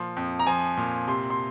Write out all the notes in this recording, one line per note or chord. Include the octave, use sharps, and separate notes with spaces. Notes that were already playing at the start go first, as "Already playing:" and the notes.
Already playing: A#2 F3
F2
A#5
F3 G#5
A#2
C3 C6
C6